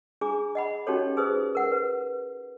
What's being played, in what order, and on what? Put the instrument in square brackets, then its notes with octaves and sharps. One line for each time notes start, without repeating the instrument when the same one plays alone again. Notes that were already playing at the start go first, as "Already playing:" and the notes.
[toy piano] D4 G#4 A#5 D6
D#5 F#5 B5
C#4 D#4 F#4 G4 A4 C#5
D#4 G#4 B4 C5 D#6
A#4 F#5
B4